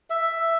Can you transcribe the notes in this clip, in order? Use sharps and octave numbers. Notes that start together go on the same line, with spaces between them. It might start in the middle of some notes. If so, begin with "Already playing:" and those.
E5